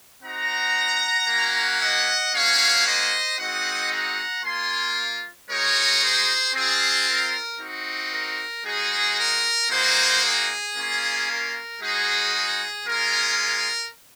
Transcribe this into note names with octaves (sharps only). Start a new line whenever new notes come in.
C4 D#4 F#4 F#5 A#5
A#3 C#4 F#4
D#5 F#5
A#3 C#4 F#4 C#5 F5
C5 D#5
G#3 C4 D#4 F#4 D#5 F#5
F#5 A#5
A#3 F4 G#5 C6
G#3 D#4 F#4 A#4 C#5
G#4 C5
C4 F4 G#4
A#4
C4 D#4 F#4
A#4
G#3 D#4 F#4 G#4
A#4
A#3 D#4 F#4 G#4 C5
G#4
A#3 C#4 F4
A#4
G#3 D#4 F#4 G#4
G#4
G#3 C#4 F4 A#4
A#4